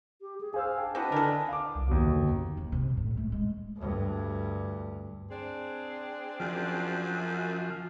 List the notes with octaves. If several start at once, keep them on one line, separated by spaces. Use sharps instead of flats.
G4
G#4
G#4 C5 F5 E6
D4 G5
C4 D4 E4 F#4 B4 D#5
D3 A4 A#4 D5 G#5 A5
F5 D6
C2
D#2 B2
D3
F#2
D#2
C3
A2
A3
G#3
D2 G2
C4 D4 G#4
F#2 F3